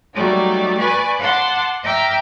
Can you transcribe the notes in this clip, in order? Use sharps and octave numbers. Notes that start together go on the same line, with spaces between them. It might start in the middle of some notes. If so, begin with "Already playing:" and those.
F#3 G3 A3 D#4 D5
B4 D5 G#5 B5 C#6
F#5 A5 C6 D6
E5 G5 A#5 D6 E6 F6